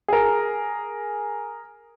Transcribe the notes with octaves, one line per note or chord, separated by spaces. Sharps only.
G#4 A#4